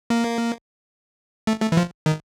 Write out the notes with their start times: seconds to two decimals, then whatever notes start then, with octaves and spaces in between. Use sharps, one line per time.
0.10 A#3
1.47 A3
1.62 A3
1.72 E3
1.77 F3
2.06 D#3